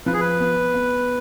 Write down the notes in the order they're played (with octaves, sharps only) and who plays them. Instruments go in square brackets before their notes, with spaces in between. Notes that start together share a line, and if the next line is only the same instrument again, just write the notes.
[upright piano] F3 [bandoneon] B4
[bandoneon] G#4
B4
[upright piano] B3
B3